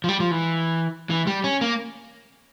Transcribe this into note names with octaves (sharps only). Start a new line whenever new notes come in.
F3
G3
F3
E3
E3
G3
C#4
A#3